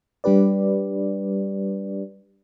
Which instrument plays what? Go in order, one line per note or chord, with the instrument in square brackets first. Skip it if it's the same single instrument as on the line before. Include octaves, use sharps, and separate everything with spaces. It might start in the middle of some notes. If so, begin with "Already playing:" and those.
[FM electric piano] G3 D4 G4 B4 D5